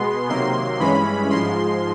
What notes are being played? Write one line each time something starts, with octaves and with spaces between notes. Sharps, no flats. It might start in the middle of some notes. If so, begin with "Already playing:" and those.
Already playing: B2 G#3 B3 C6
C3 D#3 F#3 A#3 C6
G2 E3 G#3 C#4 B5
G#2 F3 G#3 C6